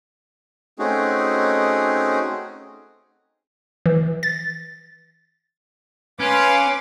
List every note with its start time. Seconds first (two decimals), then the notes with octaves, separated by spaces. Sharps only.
0.79 A3 C4 C#4 D#4 F#4 G#4
3.86 E3
4.23 A6
6.20 C#4 B4 F5 C6 D6